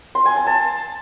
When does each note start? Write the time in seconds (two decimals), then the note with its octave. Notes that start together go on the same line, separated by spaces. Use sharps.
0.15 C6
0.26 G#5
0.36 A5
0.47 A5